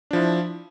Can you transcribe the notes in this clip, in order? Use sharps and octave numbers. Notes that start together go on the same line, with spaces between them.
F3 D4 E4